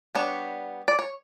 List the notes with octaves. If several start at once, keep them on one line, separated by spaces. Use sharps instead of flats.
G3 B3 D4 C#5
D5
C#5